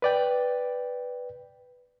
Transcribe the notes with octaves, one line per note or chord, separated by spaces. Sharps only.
B4 D5 G5